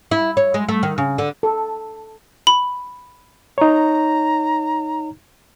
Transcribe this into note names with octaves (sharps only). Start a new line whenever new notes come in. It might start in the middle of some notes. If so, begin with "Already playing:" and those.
E4
C#5
G#3
A3
D#3
C#3
D3
A4
B5
D#4 C#5 A#5